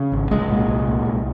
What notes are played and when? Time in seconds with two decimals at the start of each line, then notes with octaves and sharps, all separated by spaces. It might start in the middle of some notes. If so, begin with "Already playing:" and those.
Already playing: C#3
0.12 G#1
0.31 C2 G#3
0.50 A#2
0.68 C2
0.87 A#2
1.05 C2